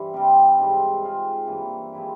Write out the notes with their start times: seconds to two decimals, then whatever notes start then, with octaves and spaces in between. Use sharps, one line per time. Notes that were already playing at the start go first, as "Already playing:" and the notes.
Already playing: G2 E3 G4 C5
0.14 C3 G3 C4
0.58 G#2 G3 C4
1.04 G#3 C4 F4
1.47 G2 E3 A#3
1.92 F3 G#3 E4 G4